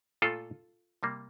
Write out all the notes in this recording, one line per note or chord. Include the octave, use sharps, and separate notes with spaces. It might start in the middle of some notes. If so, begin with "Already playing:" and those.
A#2 A3 F4 A4
C3 G3 A#3